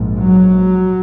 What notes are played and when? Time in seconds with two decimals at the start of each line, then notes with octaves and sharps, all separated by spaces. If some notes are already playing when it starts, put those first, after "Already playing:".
Already playing: A#1 G#2
0.18 F#3